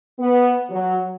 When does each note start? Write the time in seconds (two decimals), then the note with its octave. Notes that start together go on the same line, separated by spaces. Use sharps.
0.19 B3
0.70 F#3